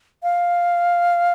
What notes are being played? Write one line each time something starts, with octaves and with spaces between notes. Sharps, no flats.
F5